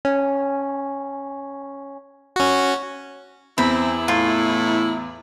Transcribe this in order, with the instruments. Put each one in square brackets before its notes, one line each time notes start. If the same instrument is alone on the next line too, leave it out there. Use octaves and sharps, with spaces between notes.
[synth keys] C#4
[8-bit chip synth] C#4 F#4
[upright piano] E2 [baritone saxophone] C4 [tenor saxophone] E4 [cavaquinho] B5
[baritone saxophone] A2 [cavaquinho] F4